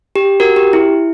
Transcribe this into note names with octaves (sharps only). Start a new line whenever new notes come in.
G4
F#4 A#4
G4
E4